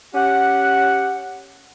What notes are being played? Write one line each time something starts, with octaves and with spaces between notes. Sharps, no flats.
C#4 G4 F#5